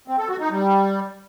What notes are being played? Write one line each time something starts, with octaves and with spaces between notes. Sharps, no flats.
C4
A4
F#4
D#4
G3